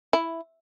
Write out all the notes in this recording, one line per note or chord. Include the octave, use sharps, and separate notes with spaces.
E4